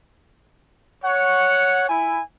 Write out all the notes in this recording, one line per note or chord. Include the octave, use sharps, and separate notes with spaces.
C#5 F#5
E4 G#5